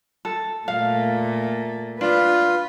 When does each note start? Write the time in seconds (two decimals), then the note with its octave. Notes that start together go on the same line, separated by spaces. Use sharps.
0.25 A4
0.68 A#2 A3 F5
2.01 D4 F4 B4